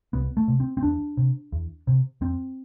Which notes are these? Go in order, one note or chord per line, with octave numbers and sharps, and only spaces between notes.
C2 B3
A3
C3
C4
C4
E2 D4
C3
E2
C3
F2 C4